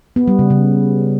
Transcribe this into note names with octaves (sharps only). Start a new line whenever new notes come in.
B3
G3
C#3
C#3